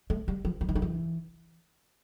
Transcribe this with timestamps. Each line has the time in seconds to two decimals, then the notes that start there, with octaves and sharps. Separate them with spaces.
0.10 A3
0.28 G3
0.45 F3
0.61 F3
0.69 E3
0.75 D#3
0.82 E3